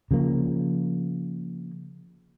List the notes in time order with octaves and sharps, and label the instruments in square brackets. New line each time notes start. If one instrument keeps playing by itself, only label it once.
[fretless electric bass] C#3 F3 A#3